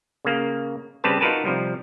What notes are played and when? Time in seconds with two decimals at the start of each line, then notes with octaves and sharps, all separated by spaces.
0.25 C#3 A#3
1.04 C#3 G3 C4 G4 B4 A5
1.21 D#4 F4 F#4 A#4 B4 A5
1.45 C3 F3 G3